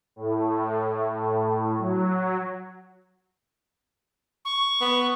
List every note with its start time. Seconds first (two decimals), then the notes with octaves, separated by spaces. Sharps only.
0.16 A2
1.78 F#3
4.45 C#6
4.81 B3